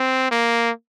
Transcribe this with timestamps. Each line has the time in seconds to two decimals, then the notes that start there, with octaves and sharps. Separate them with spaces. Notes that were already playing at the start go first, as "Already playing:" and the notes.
Already playing: C4
0.31 A#3